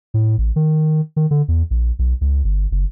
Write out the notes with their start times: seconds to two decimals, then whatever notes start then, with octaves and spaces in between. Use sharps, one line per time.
0.14 A2
0.38 A1
0.56 D#3
1.16 D#3
1.31 D3
1.48 E2
1.70 A#1
1.99 B1
2.21 C#2
2.44 G1
2.71 F#1